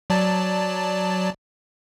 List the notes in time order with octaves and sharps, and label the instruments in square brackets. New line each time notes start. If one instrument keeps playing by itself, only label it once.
[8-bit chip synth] F#3 D5 A5